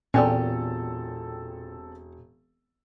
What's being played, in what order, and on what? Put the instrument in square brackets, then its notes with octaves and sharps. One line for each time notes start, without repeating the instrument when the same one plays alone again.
[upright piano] E1 [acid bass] A#2 [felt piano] C4 A4 [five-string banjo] C#4 G4 D5